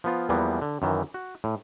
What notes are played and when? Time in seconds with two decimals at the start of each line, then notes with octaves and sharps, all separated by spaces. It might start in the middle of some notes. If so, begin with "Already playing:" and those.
0.04 F3 B3 F4
0.29 E2 E3 F3 G3 A#3 B3
0.62 D3
0.82 F#2 D#3 E3
1.14 F#4
1.44 A2